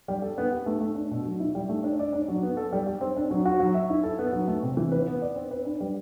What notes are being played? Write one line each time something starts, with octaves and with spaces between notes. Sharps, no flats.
G3
A4
B3
G4
A3
A3
D4
B2
F#3
E4
G3
A3
D4
D5
D4
F#3
B3
A4
G3
G4
C4
D4
F#3
F#4
F#3
E5
E4
A4
B3
F#3
A3
C3
E3
B4
B3
D5
C4
B4
D4
G3